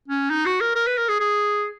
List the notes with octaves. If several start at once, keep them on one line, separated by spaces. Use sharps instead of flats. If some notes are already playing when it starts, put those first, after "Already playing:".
C#4
D#4
F#4
A#4
A#4
B4
A#4
G#4
G#4